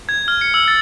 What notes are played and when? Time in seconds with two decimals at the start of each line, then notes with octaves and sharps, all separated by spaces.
0.09 G#6
0.28 F6
0.41 C#7
0.54 E6
0.68 A6